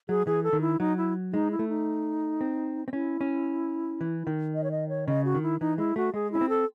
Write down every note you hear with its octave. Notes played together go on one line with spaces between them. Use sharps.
F#3 G#4
E3 G#4
A4
D#3
E4
F#3 D#4
E4
G#3 D#4
E4
A3
D#4
C4
C4
C#4 E4
C#4
E3
D#3
D#5
C#5
D#5
C#5
C#3 D#5
F#4
D#3
E4
E3 D#4
G#3 E4
A3 F#4
G#3 G#4
C#4 E4
C4
A4